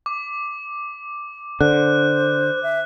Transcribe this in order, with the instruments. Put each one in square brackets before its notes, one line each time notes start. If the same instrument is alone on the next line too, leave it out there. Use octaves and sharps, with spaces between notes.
[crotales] D6
[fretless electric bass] D3 [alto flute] C5 [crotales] F#6
[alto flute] E5